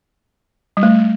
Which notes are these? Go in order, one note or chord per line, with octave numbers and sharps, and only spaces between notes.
G3
A3